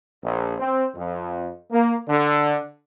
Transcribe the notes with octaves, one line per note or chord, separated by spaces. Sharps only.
A#1
C4
F2
A#3
D3